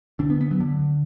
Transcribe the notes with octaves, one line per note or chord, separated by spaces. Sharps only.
D2 D3 D4
B3
B3
F#3
D3